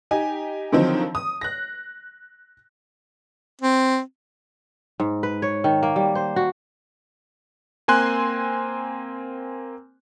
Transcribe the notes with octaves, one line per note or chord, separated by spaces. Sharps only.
D#4 G4 G#5
D3 D#3 F3 F#3 C4 D#4
D#6
F#6 A#6
C4
G#2
B4
C#5
D#3
A#3
G3
C5
F#4
A#3 C4 G#5 C6 F#6